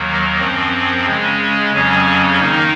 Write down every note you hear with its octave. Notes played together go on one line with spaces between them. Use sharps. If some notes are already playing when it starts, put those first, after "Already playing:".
Already playing: D#2 D#3 F#3 A#3
F#2 F3 C4
C#3 G#3 C#4
F2 C#3 F#3 C#4
D#3 A#3 D#4